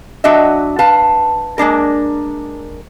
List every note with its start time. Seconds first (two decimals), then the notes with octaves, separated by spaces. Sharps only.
0.24 F#3 D4 F#4 D#5 E5
0.79 B4 F5 A5
1.58 G#3 A#3 D4 A#4